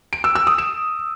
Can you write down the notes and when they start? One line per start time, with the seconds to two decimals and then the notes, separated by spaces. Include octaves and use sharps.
0.13 D7
0.24 E6
0.35 E6
0.47 D#6
0.58 E7